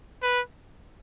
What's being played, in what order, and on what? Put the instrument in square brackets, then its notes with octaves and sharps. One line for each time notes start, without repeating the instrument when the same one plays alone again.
[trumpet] B4